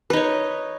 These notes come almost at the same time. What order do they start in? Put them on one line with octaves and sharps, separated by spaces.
B4 D#4 C#5